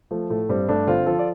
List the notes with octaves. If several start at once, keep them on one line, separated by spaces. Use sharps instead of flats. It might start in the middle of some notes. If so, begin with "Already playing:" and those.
F3 A3
A2 A3
G2 G3 C4
G2 A3 D4
D3 C4 F4
F3 F4 A4
D5